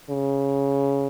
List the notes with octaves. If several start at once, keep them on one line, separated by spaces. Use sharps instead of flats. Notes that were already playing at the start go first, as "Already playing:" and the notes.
C#3